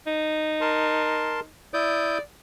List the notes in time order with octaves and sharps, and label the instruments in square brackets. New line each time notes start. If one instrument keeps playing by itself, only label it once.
[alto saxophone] D#4
[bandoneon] A#4 A5 C6
[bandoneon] E4 D#6 G6 [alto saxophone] D5